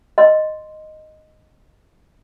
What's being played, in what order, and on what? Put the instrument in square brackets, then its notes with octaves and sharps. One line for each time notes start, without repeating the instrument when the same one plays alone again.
[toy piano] D#5 C6